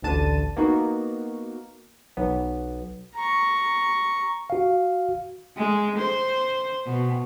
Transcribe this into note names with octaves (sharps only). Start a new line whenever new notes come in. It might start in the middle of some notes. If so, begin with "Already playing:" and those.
A1 D2 D3 A5 D#7
A#3 B3 D#4 F#4
B1 B3
A#5 C#6
F#4 F5
G#3
C5
B2